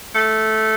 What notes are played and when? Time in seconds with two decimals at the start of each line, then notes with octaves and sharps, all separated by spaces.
0.15 A3